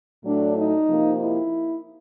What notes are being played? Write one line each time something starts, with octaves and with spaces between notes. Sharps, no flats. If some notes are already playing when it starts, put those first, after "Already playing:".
A2 F#3 A3 D4
D#4
C3 F3 A#3
E4